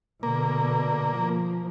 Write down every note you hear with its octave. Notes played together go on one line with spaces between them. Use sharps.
B2 D3 A#3
F3